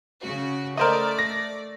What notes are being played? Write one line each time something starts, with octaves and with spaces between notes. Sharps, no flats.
C#3 F#4
A3 A#4 C5 D5 D#5
A#6